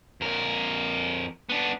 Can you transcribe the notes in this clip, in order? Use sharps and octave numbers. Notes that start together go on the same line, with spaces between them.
F2 A#4
B3 D4